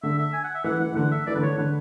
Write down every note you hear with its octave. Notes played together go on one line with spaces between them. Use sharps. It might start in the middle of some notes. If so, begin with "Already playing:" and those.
D3 E5
E5
G#5
F#5
E5
E3 F#5
E3 F#5
E3
D3 F#5
E5
E3 D5
D3 B4
E3 C#5
D3 B4